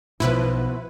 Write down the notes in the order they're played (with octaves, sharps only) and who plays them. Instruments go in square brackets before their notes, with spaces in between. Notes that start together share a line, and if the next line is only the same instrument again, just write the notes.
[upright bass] B1 [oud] B2 B3 [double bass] F3 [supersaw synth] E4 B4